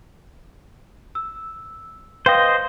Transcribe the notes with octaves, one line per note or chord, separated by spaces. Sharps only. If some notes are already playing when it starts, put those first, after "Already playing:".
E6
B4 C5 D#5 F5 G5